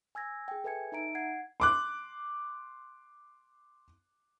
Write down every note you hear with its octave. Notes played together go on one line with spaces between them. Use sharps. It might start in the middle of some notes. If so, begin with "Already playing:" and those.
G#5 E6 G#6 A#6
G#4 G5
A4 B4 E5 G#5 G#6 C#7
D#4 E5 A#5 D7
F#5 G#6 C7
C6 D6 F#6